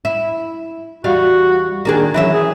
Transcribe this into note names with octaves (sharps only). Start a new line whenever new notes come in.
E4
E2 G3 F#4 F5
D#3 A#3 D4 G#4
E3 F#3 C#4 E5
G#4